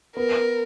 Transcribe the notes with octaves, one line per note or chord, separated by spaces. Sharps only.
B3 A#4